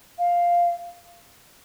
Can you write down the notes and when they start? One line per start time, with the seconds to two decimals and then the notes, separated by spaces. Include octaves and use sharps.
0.18 F5